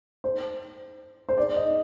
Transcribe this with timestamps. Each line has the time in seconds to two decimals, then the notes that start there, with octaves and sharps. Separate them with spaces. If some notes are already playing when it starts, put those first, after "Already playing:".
0.24 C5
1.29 C5
1.37 D5
1.56 D#5